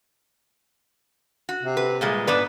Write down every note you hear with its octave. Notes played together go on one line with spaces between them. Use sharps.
F#4
C3
B4
A#2 G3 G#3
G#2 B3 D4 B4